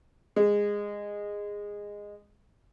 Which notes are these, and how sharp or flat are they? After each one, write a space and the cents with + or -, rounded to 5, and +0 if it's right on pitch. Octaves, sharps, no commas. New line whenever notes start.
G#3 -15